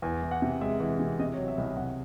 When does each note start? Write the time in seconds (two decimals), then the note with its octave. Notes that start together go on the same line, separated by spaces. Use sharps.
0.02 E2 G#5
0.23 E3
0.31 F#5
0.42 C3
0.61 G#3 E5
0.80 E3
1.00 C3
1.19 C3 D#5
1.33 C#5
1.38 F#3
1.48 E5
1.58 C2 D#5
1.63 E5
1.77 C2 F#5